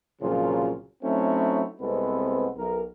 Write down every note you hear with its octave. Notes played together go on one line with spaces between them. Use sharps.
C2 A#2 C#3 F3 F#3 F4
F#3 A3 C4 C#4 D#4 E4
C2 G#3 B3 C4 A4 B4
B1 A#4